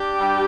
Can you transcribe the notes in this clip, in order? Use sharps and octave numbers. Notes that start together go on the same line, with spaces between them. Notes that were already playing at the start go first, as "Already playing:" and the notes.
Already playing: D4 G4
G2 G3